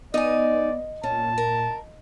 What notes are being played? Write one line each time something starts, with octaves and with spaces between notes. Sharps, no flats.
B3 D#4 D5 D#5 G#5
A#2 C#4 A5
A#4